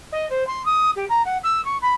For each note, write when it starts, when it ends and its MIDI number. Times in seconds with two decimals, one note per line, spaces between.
0.12 0.28 75
0.30 0.46 72
0.47 0.65 84
0.65 0.91 87
0.96 1.05 67
1.09 1.22 82
1.25 1.38 78
1.44 1.63 88
1.65 1.77 85
1.82 1.94 83